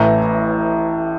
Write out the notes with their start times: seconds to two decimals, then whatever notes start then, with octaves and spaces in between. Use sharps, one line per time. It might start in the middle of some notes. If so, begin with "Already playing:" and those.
Already playing: A1 A2 E3 A#5